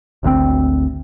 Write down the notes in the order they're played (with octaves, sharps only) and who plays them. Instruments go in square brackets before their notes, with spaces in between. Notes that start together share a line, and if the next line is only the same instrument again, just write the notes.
[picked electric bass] G#1 D2 B2 C4